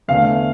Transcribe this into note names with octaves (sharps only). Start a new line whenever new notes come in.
E2 D3 A3 F5